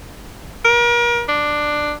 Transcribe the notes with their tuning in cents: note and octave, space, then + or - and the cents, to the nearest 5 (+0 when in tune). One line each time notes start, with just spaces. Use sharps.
A#4 +35
D4 +10